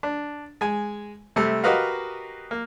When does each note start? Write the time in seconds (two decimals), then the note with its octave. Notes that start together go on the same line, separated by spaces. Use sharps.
0.03 D4
0.61 G#3 G#5
1.36 C3 G3 A3
1.64 F#4 G4 A#4 B4 D#5 F5
2.51 A#3